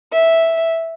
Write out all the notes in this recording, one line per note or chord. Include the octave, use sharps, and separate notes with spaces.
E5